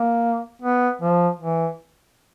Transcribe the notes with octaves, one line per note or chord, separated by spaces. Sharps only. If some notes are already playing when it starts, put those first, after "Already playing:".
Already playing: A#3
B3
F3
E3